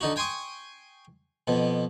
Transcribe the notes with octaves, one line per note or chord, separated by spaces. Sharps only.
D3 D#4 F#4
G5 G#5 C6 C#6 D#6
F2 B2